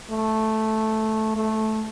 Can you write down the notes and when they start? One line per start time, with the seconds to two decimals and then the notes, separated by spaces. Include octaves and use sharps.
0.10 A3
1.36 A3